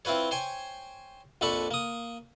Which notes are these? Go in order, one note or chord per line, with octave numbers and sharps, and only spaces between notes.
C4 E4 F4 B4 C#5
C5 C#5 G5 G#5
A#1 F2 D4 A4 B5 C#6
A#3 D#6